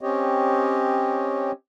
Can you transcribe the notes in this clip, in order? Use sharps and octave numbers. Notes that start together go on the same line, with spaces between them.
C4 C#4 G4 C#5 D#5